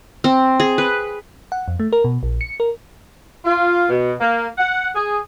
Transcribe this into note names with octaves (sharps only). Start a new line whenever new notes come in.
C4
G#4
B4
F#5
F2
A3
A#4
B2
A#1
C#7
A#4
F4
B2
A#3
F#5
G#4